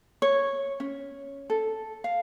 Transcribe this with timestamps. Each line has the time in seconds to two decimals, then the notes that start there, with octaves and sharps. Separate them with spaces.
0.22 C#5
0.80 C#4
1.50 A4
2.04 F5